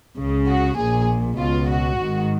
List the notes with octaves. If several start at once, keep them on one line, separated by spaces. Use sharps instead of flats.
C#2 C#3
F#4
A#1 A#2 G#4
C#2 B2 F4
F#4
G#1 G#2 D#3